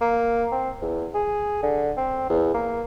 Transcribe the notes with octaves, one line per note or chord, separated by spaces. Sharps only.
A#3
C4
E2
G#4
D3
C4
E2
A#3